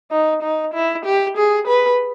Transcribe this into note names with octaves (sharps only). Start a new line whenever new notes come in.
D#4
D#4
E4
G4
G#4
B4